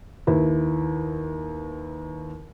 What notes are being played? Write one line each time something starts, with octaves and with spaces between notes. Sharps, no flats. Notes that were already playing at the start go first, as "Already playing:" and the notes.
D#2 E4 B4